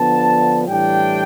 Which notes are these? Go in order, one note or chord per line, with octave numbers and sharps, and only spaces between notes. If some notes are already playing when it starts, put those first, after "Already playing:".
Already playing: D3 F3 B3 D4 A5
A2 E3 G3 D4 G5